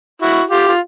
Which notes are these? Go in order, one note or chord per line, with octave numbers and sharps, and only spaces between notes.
E4 F#4
F4 G4
F4